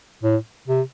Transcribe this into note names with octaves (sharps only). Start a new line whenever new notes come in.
A2
C3